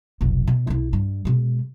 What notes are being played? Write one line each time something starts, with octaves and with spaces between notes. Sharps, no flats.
F1 B1
B2
B1 E4
G2
B2 G#3